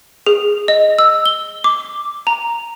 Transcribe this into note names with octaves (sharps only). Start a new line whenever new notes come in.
G#4
D#5
E6
G7
D6
A#5